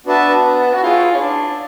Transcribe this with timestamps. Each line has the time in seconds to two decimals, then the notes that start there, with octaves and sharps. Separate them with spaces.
0.06 B3 D4 F#4 B4 E5 A5
0.73 F#4
0.82 E4 F4 G#4 C#5
1.15 C#4
1.21 D4